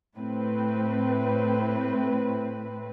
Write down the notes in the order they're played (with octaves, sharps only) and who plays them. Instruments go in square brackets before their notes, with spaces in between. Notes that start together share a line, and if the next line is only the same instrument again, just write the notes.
[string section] A2 C4 B4